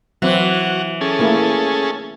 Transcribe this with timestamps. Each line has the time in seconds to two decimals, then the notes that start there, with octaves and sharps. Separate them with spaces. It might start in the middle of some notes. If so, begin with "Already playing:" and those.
0.22 E3 F#3 C4 F#4
1.01 C#4 G#4 A4
1.19 A3 A#3 E4